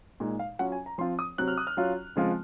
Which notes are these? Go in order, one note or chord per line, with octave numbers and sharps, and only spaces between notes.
A#2 G#3 D#4
F5
F#3 C#4 F4 F#5
G#5
A#5
F3 C4 F4 C6
D#6
C3 F#3 C4 F#6
F6
D#6
F6
F#3 C#4 F4
C#3 F3 G#3 C4 F4